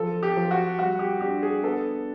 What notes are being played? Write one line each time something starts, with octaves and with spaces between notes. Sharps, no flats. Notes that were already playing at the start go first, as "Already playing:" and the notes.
Already playing: F3 A4
G4
F3
F#4
G3 F#4
G4
D4 G4
G#4
B3 A4